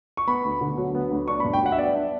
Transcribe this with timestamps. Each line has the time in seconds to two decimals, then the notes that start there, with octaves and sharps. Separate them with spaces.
0.17 C#6
0.27 B3 B5
0.44 D2
0.61 D3
0.78 F#3
0.95 B3
1.11 D2
1.28 D4 C#6
1.40 B5
1.44 G2
1.54 G5
1.62 F#3 F#5
1.72 E5
1.78 B3 D5
1.95 D4